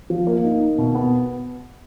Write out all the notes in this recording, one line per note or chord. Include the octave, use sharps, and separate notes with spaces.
F3
A#3
D#4
A#3
B2
B3